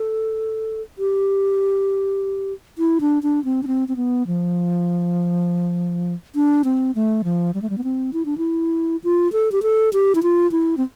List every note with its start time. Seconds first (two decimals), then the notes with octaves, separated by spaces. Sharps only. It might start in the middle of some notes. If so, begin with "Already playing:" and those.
Already playing: A4
0.98 G4
2.78 E4
3.01 D4
3.23 D4
3.45 C4
3.63 D4
3.67 C4
3.88 C4
3.96 B3
4.27 F3
6.35 D4
6.64 C4
6.95 A3
7.24 F3
7.54 G3
7.62 A3
7.70 G3
7.78 B3
7.84 C4
8.13 E4
8.25 D4
8.38 E4
9.04 F4
9.32 A4
9.52 G4
9.62 A4
9.93 G4
10.15 E4
10.23 F4
10.52 E4
10.77 C4